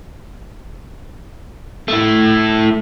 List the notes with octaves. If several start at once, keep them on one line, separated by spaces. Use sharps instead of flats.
A3 E4